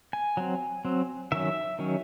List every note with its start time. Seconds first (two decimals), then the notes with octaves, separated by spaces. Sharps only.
0.13 G#5
0.37 F#3 C4
0.85 F#3 C4
1.32 D#3 F#3 C#4 E5
1.79 D#3 F#3 C#4